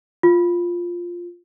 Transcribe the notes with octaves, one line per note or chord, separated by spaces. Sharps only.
F4